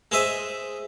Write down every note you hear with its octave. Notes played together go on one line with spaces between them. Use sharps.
G#3 C5 E5 D#6